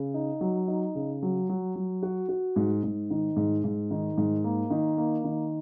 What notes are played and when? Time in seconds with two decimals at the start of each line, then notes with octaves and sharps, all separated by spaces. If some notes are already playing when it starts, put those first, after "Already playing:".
Already playing: C#3
0.14 D#4
0.41 F#3
0.68 D#4
0.95 C#3
1.22 F#3
1.49 F#3
1.75 F#3
2.03 F#4
2.29 F#4
2.56 G#2
2.84 G#2
3.10 D#3
3.36 G#2
3.64 G#2
3.91 D#3
4.17 G#2
4.44 A#3
4.70 D#3
4.98 A#3
5.24 D#3